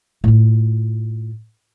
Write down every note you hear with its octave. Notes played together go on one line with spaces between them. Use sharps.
A2 F4